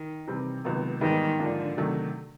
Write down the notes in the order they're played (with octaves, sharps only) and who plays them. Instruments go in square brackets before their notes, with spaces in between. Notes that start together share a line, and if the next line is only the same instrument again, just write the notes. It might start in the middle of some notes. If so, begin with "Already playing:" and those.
Already playing: [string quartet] D#3
[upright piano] C3 E3 G3 C4
C#2 C3 D#3 F#3 B3
[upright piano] G#2 E3 G3 B3 D#4 [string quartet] D#3
[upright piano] G#2 F3 A#3 D4 [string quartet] D3
[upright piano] C3 D#3 F#3 A3